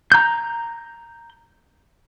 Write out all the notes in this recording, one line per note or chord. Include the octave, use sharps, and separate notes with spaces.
A#5 G6